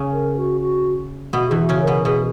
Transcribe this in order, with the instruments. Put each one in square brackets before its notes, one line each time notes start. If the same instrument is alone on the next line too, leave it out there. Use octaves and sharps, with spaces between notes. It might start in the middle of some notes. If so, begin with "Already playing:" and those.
Already playing: [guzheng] C#3 C#4
[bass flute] A#4
F#4
F#4
[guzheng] B2 B3 [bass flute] F#4
[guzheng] E2 E3 [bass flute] G#4
[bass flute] F#4
[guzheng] C#3 C#4
[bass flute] A#4
[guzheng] B2 B3
[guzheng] B2 B3 [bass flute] G#4